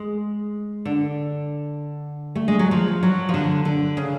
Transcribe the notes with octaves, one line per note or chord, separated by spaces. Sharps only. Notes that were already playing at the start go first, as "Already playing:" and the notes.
Already playing: G#3
D3
A3
G#3
F#3
F3
F#3
F3
D3
D3
C#3